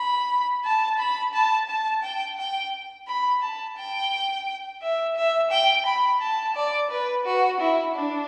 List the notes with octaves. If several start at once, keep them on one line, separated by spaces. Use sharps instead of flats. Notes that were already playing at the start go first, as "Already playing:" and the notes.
Already playing: B5
A5
B5
A5
A5
G5
G5
B5
A5
G5
E5
E5
G5
B5
A5
D5
B4
F#4
E4
D4